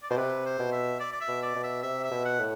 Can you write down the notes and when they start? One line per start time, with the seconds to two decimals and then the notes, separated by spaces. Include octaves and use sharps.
0.03 D5
0.10 B2 C5
0.18 C3 B4
0.46 C5
0.59 B2
0.72 E5
1.00 D5
1.13 D5
1.21 E5
1.28 B2
1.43 D5
1.56 B2
1.63 E5
1.83 C3 E5
2.04 E5
2.11 B2
2.25 F#5
2.39 A2